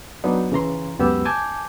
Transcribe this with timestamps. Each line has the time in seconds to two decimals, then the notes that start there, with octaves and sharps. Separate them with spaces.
0.24 F#3 B3 D4 D#4
0.52 C#3 E3 A#5 C6
0.99 C#2 F#2 B3 G4 E6
1.25 G#5 A5 D6 G6